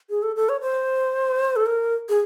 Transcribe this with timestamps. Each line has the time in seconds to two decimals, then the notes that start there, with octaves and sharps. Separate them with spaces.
0.10 G#4
0.23 A4
0.36 A4
0.49 C#5
0.61 C5
1.56 A4
1.66 A#4
2.09 G#4